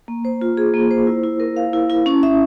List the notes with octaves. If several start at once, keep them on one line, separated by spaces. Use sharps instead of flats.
A#3
C5
F4
G#4
A#3
C5
E4
E4
A#4
F5
E4
E4
C#4
E5